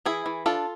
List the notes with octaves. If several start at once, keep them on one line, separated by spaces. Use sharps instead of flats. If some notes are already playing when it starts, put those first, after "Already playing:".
E3 E4 G#4
E3
D4 F4 A4